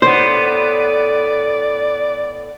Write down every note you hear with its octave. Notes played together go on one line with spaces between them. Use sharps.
A2 B3 C5 D5